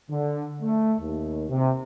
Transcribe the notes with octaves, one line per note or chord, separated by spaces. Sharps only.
D3
A3
D#2
C3